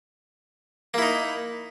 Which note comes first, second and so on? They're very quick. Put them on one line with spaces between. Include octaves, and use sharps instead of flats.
A#3 E4 D#4